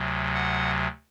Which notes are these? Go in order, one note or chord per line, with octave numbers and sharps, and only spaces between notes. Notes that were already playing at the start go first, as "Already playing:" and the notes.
Already playing: D2 C3 F#3
F#5